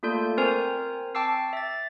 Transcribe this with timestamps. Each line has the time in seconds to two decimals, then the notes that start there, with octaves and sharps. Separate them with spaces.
0.03 A3 A#3 F4 A4 D5 G6
0.37 C4 A#4 C5 G#5
1.15 G5 A5 C#6 D6 E6 C7
1.53 E5 A6